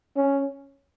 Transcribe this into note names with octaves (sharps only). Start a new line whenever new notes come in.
C#4